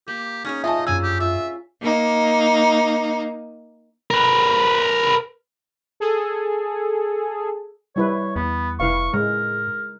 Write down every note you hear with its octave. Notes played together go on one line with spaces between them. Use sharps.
A#3 G4
C#4 D#4 G#4 C#5
D#4 F4 D#5 E5 G#5 A5
F#2 C#4 D4 G#4 G#5 E6
G4
F4 E5
A#3 D#4
A#4 B4
G#4 A4
G3 E4 B4 C#5
E2 B3
F1 E4 B4 F5 C#6
A2 G#3 A#4